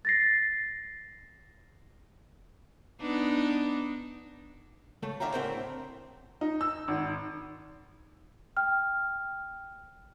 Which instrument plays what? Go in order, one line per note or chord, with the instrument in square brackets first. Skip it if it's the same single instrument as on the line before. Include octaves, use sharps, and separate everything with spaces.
[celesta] A6 A#6 C7
[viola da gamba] B3 D4 D#4
[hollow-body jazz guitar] C#3 A3 A4
A2 D3 E5 F5 G5 A#5
D2 A2 C#3 C4 A#4 C5
[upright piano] D#4
E6
G#1
[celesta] G5 F6